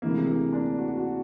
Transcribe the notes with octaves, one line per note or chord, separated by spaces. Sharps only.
D2 C3 E3 G#3 A#3
A#3
D4
F#4
F#4